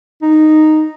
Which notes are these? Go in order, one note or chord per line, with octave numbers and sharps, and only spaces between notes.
D#4